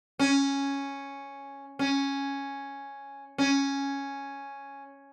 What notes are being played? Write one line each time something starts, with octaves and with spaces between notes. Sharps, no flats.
C#4
C#4
C#4